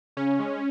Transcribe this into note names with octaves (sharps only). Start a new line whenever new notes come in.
C#3 C#4
G#3